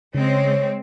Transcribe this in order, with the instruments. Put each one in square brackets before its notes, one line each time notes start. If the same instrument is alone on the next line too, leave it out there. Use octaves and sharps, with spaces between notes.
[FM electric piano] C#3 [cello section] G#3 C4 [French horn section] C#5